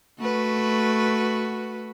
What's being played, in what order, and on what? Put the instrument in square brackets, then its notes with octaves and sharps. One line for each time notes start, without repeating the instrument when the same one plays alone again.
[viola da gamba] A3 F#4 B4